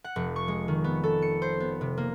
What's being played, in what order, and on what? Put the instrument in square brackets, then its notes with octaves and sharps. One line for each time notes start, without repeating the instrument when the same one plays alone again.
[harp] F#5
F1
C#6
G#3
D#3
B3
A4
C#7
C5
B3
C3
A#3